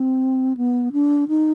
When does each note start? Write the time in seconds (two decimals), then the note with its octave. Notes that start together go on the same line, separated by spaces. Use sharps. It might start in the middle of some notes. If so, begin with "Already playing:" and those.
Already playing: C4
0.57 B3
0.93 D4
1.28 D#4